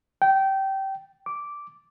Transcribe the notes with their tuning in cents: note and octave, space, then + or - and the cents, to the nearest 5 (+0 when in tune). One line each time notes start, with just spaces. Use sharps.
G5 -20
D6 -5